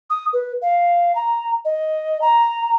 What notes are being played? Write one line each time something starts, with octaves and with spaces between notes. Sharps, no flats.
D#6
B4
F5
A#5
D#5
A#5